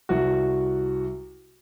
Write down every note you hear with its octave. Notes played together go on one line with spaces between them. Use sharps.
C2 F#4